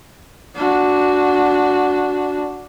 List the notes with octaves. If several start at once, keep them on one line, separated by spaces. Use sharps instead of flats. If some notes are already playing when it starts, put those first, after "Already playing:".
D4 F#4